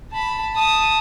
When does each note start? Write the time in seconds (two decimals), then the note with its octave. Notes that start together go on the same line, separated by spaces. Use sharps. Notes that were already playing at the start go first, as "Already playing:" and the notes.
0.11 A5 B5
0.55 A5 D#6